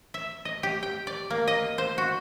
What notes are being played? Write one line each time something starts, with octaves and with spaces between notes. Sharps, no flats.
E5
D#5
G4
G5
D5
A#3
D#5
C5
F#4